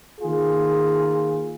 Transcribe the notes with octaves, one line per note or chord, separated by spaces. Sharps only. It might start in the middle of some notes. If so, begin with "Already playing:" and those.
D#3 A#3 F4 G#4